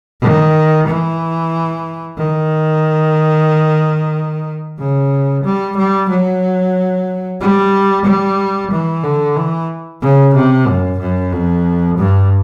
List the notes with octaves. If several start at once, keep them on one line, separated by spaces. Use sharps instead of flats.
D#3
E3
D#3
C#3
G3
G3
F#3
G3
G3
E3
D3
E3
C#3
C3
F#2
F#2
F2
G2